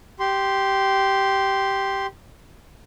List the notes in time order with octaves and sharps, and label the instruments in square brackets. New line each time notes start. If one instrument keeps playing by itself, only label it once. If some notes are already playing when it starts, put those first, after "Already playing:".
[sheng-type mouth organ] G4 C6